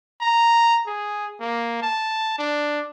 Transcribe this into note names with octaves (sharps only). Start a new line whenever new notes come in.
A#5
G#4
A#3
A5
D4